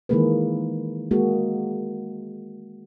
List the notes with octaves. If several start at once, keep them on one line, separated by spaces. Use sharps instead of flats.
D#3 E3 G#3 A#3 G#4 B4
G#3 A#3 F#4 G#4